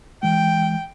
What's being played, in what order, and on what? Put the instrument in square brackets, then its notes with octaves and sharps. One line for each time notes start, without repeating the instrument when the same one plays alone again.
[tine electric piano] E3 G#3 [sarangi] G5